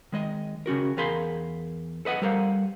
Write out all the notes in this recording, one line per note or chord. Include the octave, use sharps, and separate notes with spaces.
D#3 G#3 D#5
C#3 C#4 F#4 A#4
E2 G#4 A#4 F5 B5 C6
A4 B4 D#5 F#5
G3 A4 A#4 C5 F5